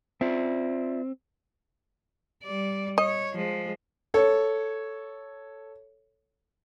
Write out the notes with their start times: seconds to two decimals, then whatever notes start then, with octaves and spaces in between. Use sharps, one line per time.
0.21 C4 F4 D5 E5
2.43 G3 D5
2.98 C#5 D#5
3.34 F3 G#3
4.14 A4 C#5